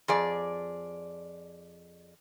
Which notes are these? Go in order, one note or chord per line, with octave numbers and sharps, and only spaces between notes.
F2 G#4 D5